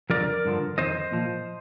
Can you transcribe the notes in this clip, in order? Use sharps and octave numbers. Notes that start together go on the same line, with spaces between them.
F2 D3 F3 A#4 D5
G2 D3 F3
F2 D#3 C5 D#5
A#2 F3